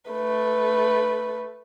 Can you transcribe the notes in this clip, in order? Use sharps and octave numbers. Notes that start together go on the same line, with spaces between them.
A3 B4